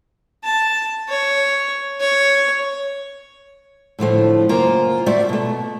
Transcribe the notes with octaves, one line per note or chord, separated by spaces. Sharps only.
A5
C#5
C#5
A2 D3 F3 A3
F#2 C#3 A#3 F4 C5 A#5
A3 F4 F#4 D5 E5 F#5
B2 A3